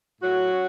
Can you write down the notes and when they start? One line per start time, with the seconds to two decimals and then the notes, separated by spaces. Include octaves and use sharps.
0.22 A2 F#3 F#4
0.53 C#4